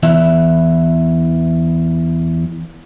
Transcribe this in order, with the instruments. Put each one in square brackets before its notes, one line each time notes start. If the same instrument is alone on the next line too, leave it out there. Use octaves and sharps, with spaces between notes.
[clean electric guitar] E2 E3 E5